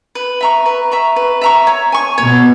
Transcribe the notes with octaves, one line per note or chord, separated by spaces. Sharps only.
B4
E5 A#5 C#6
B4
E5 A#5 C#6
B4
E5 A#5 C#6
C#5
G#5 C#6
B2 C#5